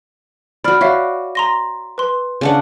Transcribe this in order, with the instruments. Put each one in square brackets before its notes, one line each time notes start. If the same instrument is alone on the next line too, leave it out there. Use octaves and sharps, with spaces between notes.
[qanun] F#4 D5 [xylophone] B5 F6
[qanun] F#4 [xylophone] C#5 E5 F5
[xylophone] A#5 C6 A#6
B4 C6
[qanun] C#3 D4 F#5